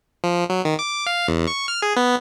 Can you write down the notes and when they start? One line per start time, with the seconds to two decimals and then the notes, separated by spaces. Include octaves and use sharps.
0.24 F3
0.50 F#3
0.65 D#3
0.79 D6
1.06 F5
1.28 E2
1.47 C#6
1.68 F6
1.82 G#4
1.97 B3